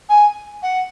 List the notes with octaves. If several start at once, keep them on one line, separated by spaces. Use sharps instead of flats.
G#5
F#5